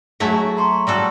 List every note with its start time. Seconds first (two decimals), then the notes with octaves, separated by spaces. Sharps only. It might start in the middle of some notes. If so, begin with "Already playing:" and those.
0.20 F#3 A3 E4 G#4
0.57 A#5 C6 C#6
0.87 G3 F#4 A4